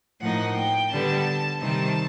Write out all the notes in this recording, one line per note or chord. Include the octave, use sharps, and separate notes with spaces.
A2 F3 A#3 D#4 F#5
G5
D3 G3 B3 A5
C3 D#3 G3 C4 D#4 A5